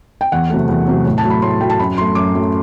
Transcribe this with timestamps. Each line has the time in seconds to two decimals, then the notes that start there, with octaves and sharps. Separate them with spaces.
0.21 G5
0.32 E2 F#5
0.50 C3 F#3 A3
0.69 E2
0.87 C3 F#3 A3
1.06 A2
1.18 A5
1.24 F#3 A3
1.30 B5
1.42 A2 C6
1.61 F#3 A3 G5
1.70 A5
1.79 F#2 B5
1.97 F#3 C6
2.01 A3
2.15 F#2 D6
2.34 F#3 A3